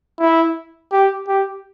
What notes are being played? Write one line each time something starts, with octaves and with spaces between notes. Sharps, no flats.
E4
G4
G4